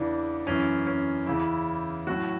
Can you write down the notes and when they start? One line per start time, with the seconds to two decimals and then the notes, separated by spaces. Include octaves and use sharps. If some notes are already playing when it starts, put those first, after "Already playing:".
Already playing: E2 C#3 E3 D4
0.47 F#2 E3 C#4
0.87 C#4
1.26 E2 C#3 E3 E4
2.07 A2 F#3 F#4